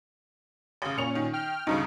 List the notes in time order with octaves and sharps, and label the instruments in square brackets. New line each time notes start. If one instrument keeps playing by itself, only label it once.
[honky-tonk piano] A1 C#3
[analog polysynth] A#2 C#4 [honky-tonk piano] C#7 F7
[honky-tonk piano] D#3
[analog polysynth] G5 F6
[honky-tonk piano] D2 G2 C#3 [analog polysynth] D#4